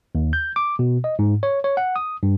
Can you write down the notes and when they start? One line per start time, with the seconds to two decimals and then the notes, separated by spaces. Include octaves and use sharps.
0.15 D#2
0.33 G6
0.56 D6
0.79 B2
1.04 D#5
1.19 G#2
1.43 C#5
1.64 C#5
1.77 F#5
1.96 D#6
2.23 G2